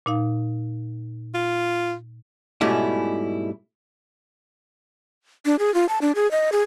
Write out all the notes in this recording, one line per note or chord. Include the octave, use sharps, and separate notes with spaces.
A#2 D#4 F5
F4
G#2 B2 G3 A3 C#4 E4
D4
G#4
F4
A5
D4
G#4
D#5
G#4